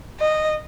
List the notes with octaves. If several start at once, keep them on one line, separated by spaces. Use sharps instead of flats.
D#5